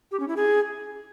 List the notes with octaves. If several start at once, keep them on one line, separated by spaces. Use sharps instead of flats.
G4
C#4
E4
G#4